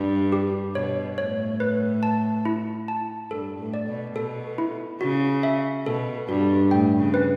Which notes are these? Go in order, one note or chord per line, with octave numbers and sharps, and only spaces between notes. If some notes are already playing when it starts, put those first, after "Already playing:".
Already playing: G2 G4
G4
B2 C#5
A2 C#5
B4
A5
E4
A5
G2 A4
A2
D5
B2
B2 A4
E4
C#3 F#4
E5
B2 A4
G2 F#4
A2 G5
C#3
B4